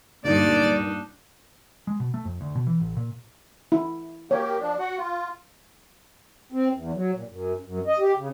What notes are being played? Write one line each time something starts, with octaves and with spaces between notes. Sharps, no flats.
D2 G2 A#2 D4 D#4 D5
G#3
B2
A3
F2
D2
B2
E3
A1
A#2
E4
A#3 G4 C#5
F3 D4
F#4 F#5
F4
C4
E2
F#3
A#2
F#2
F#2
D#5
G4
C#3